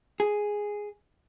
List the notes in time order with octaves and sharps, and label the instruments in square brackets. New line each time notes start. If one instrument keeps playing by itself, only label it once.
[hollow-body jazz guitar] G#4